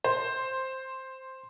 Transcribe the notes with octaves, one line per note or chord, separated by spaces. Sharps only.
C5